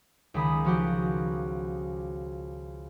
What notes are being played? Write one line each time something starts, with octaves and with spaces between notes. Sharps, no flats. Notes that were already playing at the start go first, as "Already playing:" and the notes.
C#2 D#3 B5 D#6
F3 F#4 G4